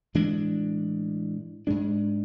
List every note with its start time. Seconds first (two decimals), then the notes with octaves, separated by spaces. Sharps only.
0.15 A2 E3 G#3 D4
1.67 G#2 G#3 D4